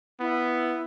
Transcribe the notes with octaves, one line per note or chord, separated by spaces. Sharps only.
B3 E4